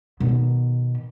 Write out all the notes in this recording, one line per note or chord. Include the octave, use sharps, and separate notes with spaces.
B2 D#3